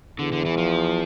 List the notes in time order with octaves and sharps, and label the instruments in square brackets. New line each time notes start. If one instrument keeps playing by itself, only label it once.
[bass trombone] E2 [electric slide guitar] D3
[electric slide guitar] D3
E3
F3